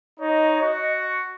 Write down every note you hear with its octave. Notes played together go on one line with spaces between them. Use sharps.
D#4 C#5 D#5
F#4 C#6